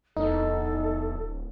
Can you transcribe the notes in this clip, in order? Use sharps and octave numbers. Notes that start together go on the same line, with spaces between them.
D1 E2 D#4 A4